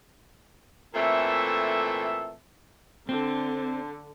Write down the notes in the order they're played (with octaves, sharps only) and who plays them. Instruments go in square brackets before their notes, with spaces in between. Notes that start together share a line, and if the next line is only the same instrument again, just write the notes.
[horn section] A#2 E3 A3 C4 A4 E5
[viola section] D3 [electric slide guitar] C4